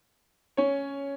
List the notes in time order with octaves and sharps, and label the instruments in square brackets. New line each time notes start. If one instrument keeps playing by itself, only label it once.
[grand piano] C#4 C#5